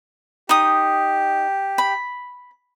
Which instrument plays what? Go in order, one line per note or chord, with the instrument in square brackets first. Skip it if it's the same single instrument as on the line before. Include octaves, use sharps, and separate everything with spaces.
[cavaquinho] D#4 D#6 [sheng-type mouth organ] G4
[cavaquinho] B5